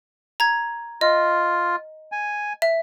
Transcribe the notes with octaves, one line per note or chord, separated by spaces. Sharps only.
A#5 G#6
F4 D#5
G#5
E5